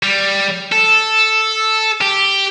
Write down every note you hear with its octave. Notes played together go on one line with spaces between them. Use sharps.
G3
A4
G4